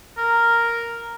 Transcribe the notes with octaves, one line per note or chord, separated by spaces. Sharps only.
A#4